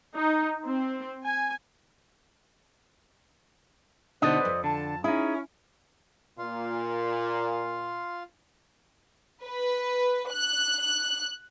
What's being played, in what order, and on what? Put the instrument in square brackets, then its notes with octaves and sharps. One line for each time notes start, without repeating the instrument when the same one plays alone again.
[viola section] D#4
C4
G#5
[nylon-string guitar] B2 D3 D#4 [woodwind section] B4 [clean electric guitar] C5 D5 D#5
[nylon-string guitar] F2
[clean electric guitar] D3 [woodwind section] A5
[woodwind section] C#4 [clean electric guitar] D#4 G#4 [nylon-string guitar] E4
[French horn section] A#2 [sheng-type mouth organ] F4 F5 C6
[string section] B4
F#6